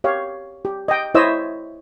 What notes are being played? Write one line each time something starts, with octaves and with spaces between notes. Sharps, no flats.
G4 C#5 F5
G4
D#5 G5
E4 C5 C#5 D#5 E5 E6